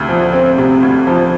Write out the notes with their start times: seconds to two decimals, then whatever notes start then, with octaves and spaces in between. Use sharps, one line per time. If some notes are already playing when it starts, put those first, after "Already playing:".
Already playing: D2 C3
0.09 F3
0.33 C4
0.58 C3
0.83 D2
1.07 F3